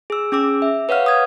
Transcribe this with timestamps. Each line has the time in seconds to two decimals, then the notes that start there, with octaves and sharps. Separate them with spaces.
0.10 G#4 E6
0.32 C#4 G#4 D6 E6
0.62 E5
0.89 B4 C#5 F5 F#5 F6
1.06 D#6 G#6